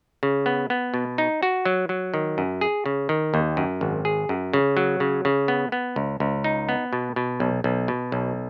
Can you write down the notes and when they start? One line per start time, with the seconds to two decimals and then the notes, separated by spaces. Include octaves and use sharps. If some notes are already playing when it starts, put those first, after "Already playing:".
0.23 C#3
0.46 B3
0.70 B3
0.94 B2
1.18 D#4
1.43 F#4
1.65 F#3
1.89 F#3
2.14 D#3
2.38 F#2
2.61 G#4
2.86 C#3
3.09 D#3
3.34 D#2
3.57 F#2
3.81 G#1
4.05 G#4
4.29 F#2
4.53 C#3
4.77 F#3
5.00 C#3
5.25 C#3
5.48 B3
5.72 B3
5.96 C#2
6.20 C#2
6.44 D#4
6.69 B3
6.93 B2
7.16 B2
7.40 B1
7.64 B1
7.88 B2
8.12 B1